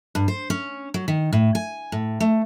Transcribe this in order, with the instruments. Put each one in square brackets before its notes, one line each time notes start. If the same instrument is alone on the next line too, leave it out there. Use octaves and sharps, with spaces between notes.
[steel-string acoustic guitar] G2
C5
C#4
F#3
D#3
A2
G#5
A2
A3